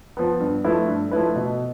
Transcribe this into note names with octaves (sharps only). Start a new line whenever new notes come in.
F3 B3
G2
F3 A3 E4 B4
G2
F3 A3 E4 B4
B2